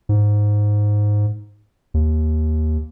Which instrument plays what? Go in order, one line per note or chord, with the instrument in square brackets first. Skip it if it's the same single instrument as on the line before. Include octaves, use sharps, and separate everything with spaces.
[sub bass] G#2
D#2